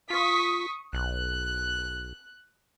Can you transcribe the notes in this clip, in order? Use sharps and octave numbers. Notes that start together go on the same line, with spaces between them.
F4 C#6 D#6 B6
B1 F#6